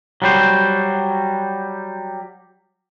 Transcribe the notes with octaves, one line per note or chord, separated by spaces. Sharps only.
F#3 G3 C5